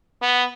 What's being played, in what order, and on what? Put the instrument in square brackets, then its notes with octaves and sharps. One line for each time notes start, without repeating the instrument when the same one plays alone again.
[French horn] B3